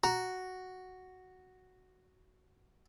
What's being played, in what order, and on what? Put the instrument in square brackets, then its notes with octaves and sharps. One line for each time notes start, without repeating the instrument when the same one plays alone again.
[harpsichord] F#4 [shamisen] A#5